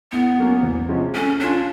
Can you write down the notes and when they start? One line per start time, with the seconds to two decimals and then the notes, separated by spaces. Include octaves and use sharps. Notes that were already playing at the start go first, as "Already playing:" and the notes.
0.12 A2 B3
0.38 F#3 A#3 C#4
0.63 E2
0.89 C3 F3 G#3 C#4
1.15 A3 C#4
1.40 C#4 D4 F4